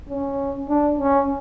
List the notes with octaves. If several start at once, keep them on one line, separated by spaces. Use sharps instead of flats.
C#4
D4
C#4